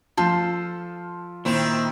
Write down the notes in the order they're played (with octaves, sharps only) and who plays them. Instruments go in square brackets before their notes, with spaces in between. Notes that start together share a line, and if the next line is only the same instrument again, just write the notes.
[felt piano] F3 F4 [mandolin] A4 C5 F5
[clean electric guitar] A#2 [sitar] D#3 C4 E4